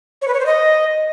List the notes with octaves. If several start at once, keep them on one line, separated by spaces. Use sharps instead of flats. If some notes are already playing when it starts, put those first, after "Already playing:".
C#5
B4
C#5
C5
D#5